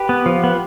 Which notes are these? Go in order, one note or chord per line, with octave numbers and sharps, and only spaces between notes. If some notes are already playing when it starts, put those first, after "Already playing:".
Already playing: G4 B4
B3
F3
B3